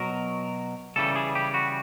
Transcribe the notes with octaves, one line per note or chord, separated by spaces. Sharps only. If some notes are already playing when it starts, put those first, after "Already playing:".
Already playing: B2 F#3 A#4
C#3 E3 G3 A4
G#4
G4
F#4